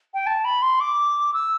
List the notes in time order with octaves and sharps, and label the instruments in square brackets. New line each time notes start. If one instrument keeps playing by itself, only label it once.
[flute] G5
A5
B5
C6
D6
E6